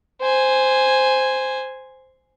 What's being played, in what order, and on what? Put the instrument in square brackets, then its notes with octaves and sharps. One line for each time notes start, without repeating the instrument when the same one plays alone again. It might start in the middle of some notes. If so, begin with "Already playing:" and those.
[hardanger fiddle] C5 G#5